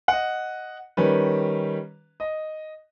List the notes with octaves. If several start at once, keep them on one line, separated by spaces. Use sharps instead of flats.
D#5 F#5
D#3 G3 C#4 B4
D#5